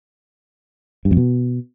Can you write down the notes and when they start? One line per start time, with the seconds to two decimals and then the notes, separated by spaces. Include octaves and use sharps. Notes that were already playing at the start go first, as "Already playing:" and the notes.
1.05 G2
1.11 F2
1.17 B2